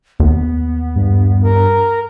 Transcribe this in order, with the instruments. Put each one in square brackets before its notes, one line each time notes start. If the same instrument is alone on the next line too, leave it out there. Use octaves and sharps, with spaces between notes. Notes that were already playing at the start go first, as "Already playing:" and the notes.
[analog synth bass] D#2 [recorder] B3
[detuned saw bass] G2
[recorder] A#4